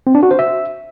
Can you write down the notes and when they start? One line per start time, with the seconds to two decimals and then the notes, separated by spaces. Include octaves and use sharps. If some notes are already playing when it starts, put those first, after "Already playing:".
0.07 C4
0.15 D4
0.23 F#4
0.31 C5
0.39 E5